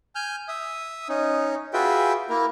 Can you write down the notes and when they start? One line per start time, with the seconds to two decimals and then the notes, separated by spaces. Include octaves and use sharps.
0.15 G#5 F6 G6
0.48 E5 D#6
1.09 C#4 D#4
1.73 F4 F#4 G#4 B4 E5 G5
2.30 A#3 E4 A#4